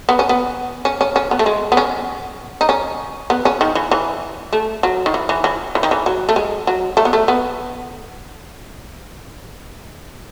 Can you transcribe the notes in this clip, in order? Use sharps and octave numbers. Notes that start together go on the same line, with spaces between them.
B3
C#4
B3
C#4
C#4
C#4
B3
A3
G#3
B3
C#4
D#4
C#4
B3
C#4
D#3
E3
E3
A3
F#3
D#3
E3
E3
E3
E3
D#3
E3
F#3
A3
G#3
F#3
A3
B3
A3
B3